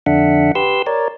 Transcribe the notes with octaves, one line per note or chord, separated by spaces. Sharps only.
F2 D3 D4 E5 F#5
G4 B4 C6 E6
A#4 C#5 D5